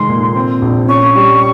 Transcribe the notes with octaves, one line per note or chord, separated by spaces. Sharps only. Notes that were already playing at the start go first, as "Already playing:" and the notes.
Already playing: F1 D#3 G#3 C6
A#2
C4
A#1
C#4 C#6
G3